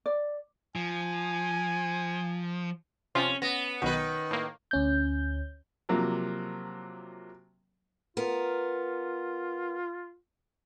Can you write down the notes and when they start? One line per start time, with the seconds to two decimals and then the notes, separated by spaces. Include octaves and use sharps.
0.06 D5
0.76 F3 G#5
3.15 C3 F3 C#4 F4
3.42 B3 A#6
3.82 B1 B2 D#3 B4
4.31 A2 A#3
4.71 D2 C#4 G6
5.89 C3 F3 F#3 A#3
8.17 B3 F4 A#4